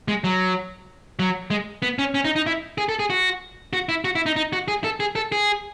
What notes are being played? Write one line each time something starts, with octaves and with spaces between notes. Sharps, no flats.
G#3
F#3
F#3
G#3
B3
C#4
C#4
D#4
D#4
E4
G#4
A4
G#4
F#4
F#4
E4
F#4
E4
D#4
D#4
F#4
G#4
A4
G#4
A4
G#4